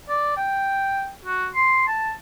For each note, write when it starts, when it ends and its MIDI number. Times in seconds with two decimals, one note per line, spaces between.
0.09 0.34 74
0.37 1.10 79
1.25 1.47 66
1.54 1.86 84
1.87 2.12 81